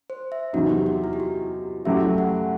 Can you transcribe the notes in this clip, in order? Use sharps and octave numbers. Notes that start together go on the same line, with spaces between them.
C5
E5
E2 C3 F#3 C4 D#4 F#4
G4
F#4
E4
G4
F#4
F#2 F#3 A3 E4 G4 E5
F#5